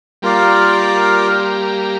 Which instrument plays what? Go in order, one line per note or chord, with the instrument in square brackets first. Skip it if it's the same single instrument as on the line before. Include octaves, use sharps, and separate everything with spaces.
[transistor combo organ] G3 A#3 [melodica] F4 A#4 D5 F5